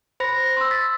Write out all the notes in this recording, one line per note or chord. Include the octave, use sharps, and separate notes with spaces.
C5 B5 A#6
C6 E6
A6 B6